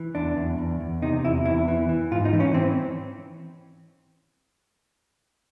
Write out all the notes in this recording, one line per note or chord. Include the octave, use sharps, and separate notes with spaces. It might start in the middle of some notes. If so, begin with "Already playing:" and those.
Already playing: E3
E2 D4
E2
E2
E2
C3 D#4
E2 E4
E2 E4
E3
E3
G#2 F4
D#4
E3
C#4
E3 C4